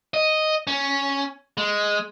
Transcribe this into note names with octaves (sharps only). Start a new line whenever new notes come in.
D#5
C#4
G#3